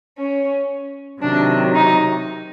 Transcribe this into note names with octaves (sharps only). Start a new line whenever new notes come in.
C#4
C3 D#3 F#3 D4
D#4